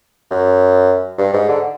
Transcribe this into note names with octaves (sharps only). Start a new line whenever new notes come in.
F#2
G2
G#2
D3